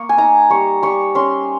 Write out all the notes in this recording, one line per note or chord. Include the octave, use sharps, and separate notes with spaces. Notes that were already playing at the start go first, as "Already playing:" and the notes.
Already playing: A#3 C#6
G#5
D#4 A#5
G3 C#6
G3 C#6
C#4 C6